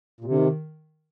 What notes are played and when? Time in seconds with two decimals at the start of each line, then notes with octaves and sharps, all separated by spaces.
0.21 A#2
0.24 C3
0.30 D3
0.38 D#3